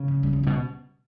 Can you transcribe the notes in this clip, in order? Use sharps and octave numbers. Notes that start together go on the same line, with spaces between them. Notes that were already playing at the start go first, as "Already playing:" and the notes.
Already playing: C#3
F3
G3
F#3
G3
B2